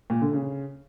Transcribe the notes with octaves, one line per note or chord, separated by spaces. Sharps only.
A#2
D3
C#3